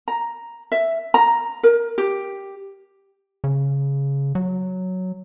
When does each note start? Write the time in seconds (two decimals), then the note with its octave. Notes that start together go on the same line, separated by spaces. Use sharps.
0.08 A#5
0.72 E5
1.14 A#5
1.63 A#4
1.98 G4
3.44 C#3
4.35 F#3